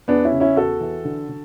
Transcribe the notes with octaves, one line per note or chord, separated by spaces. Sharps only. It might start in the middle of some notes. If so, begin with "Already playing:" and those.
E2 B3 D4
C#4 E4
C#3
C#4 E4
E2 F#4 A4
E3
D3
D3